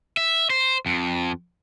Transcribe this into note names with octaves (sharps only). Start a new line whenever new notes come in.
E5
C5
F2